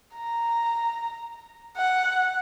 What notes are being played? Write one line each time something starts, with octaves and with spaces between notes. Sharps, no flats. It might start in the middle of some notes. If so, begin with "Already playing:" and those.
A#5
F#5